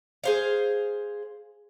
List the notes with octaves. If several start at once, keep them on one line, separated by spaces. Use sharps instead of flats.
G#4 C5 F5